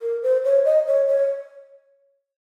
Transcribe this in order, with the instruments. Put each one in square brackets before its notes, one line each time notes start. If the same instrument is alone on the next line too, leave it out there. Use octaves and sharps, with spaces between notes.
[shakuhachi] A#4
C5
C#5
D#5
C#5
C#5